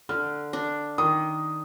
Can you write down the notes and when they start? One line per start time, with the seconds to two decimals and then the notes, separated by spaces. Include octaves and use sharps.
0.09 D3 F6
0.53 D4
0.98 D#3 D#6